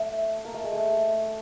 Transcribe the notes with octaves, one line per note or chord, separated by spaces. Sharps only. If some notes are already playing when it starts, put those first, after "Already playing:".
Already playing: A3
A#3
A3
G#3
A3